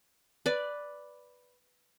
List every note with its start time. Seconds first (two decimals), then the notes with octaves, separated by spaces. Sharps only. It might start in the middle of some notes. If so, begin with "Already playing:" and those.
0.46 B4 D5